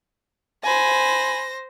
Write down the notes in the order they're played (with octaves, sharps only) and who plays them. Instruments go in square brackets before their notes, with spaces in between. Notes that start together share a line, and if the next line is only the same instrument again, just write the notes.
[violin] C5 A#6 [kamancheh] G#5 B5